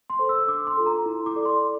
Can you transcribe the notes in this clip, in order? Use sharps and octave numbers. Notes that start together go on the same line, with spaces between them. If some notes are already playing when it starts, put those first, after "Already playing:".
C6
A4 C5
E6
D4 D6
C6
F4 A4
A#5
E4
D6
A4 D5
C6